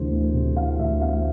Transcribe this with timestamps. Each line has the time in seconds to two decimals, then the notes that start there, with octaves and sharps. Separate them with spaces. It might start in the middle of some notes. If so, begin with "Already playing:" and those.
Already playing: D2 C3 E3 C5
0.11 A3
0.34 C3
0.56 E3 F5
0.79 D2 E5
1.02 A3 F5